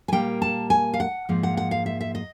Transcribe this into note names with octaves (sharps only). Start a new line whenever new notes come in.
G#5
A#2 G3 A#3 G5
A5
G#5
F5
F#5
G#2 F3 A#3
F#5
F#5
F5
E5
E5
D#5